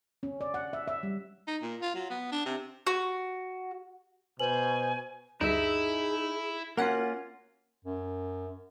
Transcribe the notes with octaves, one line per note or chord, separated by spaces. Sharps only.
C#4
D5
F#5
E5
E5
G3
D#4
A#2
F4
F#3
B3
D4
C3
F#4
B2 B4 C5 G#5 F#7
D2 G2 D#4 E4 G#4 E5
A#3 C#4 F4 F#4 A#4 F#5
F#2